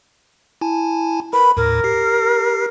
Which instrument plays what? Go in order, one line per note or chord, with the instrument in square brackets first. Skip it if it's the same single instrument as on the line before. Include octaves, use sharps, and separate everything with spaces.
[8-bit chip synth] E4 G#5 A5
[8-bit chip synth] A#4 B4 [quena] B5
[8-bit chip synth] D#2 A2 [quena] A#4
[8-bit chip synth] G4 C7